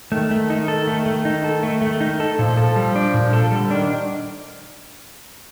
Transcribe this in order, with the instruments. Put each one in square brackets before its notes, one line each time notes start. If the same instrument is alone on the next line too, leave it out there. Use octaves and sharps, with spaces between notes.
[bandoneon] D#3 [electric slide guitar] A3
[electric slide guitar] A3
D#4
A4
A3
A3
D#4
A4
A3
A3
D#4
A4
[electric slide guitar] A#2 [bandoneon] F3
[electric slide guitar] A4
G3
D4
A#2
A4
[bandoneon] D3 [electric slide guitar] G3
[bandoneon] D#3 [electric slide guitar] D4